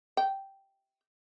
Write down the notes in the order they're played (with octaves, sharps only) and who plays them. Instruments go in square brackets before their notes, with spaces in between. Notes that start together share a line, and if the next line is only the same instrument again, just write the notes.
[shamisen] G5